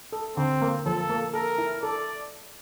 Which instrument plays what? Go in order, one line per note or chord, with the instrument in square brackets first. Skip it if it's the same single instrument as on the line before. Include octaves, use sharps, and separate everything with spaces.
[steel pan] A4
[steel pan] D3 [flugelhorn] C4
[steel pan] A#3
[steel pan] F3 [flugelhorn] A4
[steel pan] A#3
[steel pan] A4 [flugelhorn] A#4
[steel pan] E4
[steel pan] A4 [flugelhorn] D5